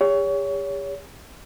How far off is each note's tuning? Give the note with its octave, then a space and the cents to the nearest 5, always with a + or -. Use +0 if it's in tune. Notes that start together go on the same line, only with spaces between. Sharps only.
G4 +45 C#5 +25